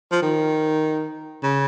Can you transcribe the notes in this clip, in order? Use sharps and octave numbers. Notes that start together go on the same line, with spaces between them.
F3
D#3
C#3